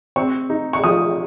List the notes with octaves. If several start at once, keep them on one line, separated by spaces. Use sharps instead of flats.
C4 C#6
D#4
C#6
F3 D#6